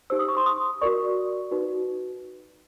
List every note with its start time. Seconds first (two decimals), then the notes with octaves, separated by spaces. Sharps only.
0.10 D#4 G4 C5 E6
0.19 D#6
0.28 C#6
0.37 C6
0.46 D#6
0.82 F#4 A#4 D5 C#6
1.51 D#4 F#4 B4